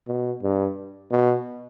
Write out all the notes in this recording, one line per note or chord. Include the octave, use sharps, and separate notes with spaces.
B2
G2
B2